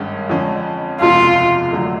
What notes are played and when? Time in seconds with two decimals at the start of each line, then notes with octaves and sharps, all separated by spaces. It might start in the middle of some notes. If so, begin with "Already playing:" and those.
Already playing: G#1 G2 D#3 G#3 C#4
0.29 F2 D3 F3 G#3 C#4
1.01 F#1 E2 C3 F3 G#3 F4
1.72 G#1 F#2 D3 F#3 A3